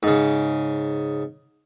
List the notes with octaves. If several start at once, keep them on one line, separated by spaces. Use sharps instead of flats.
G#2 C#3